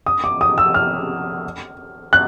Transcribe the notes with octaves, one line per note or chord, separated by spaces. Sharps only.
D#6
D6
D#6
E6
F6
F#6